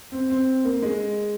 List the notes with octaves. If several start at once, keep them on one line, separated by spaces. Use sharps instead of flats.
C4
C4
A#3
G#3